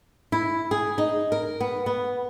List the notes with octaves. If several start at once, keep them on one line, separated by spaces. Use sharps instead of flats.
E4
G#4
D#4
A#4
B3
B3